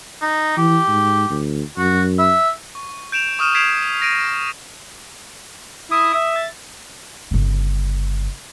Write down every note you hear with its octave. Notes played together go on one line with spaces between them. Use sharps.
D#4
E3 G4
G#2
D2
F#2 F#4
E5
C#6
G6 D7 E7 F7
C#6 D#6 F6 D#7 E7
G#6 B6 C7 D7 E7 F7
A#6 D7 D#7
E4 D#6
E5
A6
G1 C#3